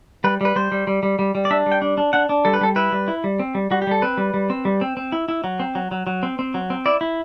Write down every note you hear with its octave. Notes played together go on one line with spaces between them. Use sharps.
G3 B4
G3 B4
G3 C5
G3
G3
G3
G3
G3
D5
D4 E5
G3
G5
D4
D4
D4 F#5
D4
G3 A4
B4
G3 A4
E4 B4
G3
E4
G3
C4
G3
G3 F#4
G4
G3 A4
C4 B4
G3
G3
C4
G3
C4
C4
E4
E4
F#3
C4
F#3
F#3
F#3
C4
C4
F#3
C4
E4 D5
E4